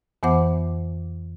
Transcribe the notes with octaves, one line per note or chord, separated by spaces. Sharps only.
F2 E3 B3 C5 F#5 D6